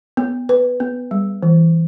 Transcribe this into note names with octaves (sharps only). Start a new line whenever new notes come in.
B3
B4
B3
G3
E3